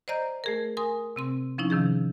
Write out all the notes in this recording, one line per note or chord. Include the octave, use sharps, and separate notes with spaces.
C5 D5 D#5 A#5 G6
A3 G#4 A#4
A#4 G#5 C6 D#6
C3 C4 C6
F3 C#4 D#4 E4
C3 D#3 F3 G#4